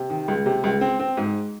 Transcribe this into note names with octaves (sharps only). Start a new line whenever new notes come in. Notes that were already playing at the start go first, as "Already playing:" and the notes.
Already playing: C3
D#3
C#2
C3
C#2
C4
C4
G#2